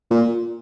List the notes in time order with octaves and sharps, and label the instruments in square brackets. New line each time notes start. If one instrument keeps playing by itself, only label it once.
[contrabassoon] A#2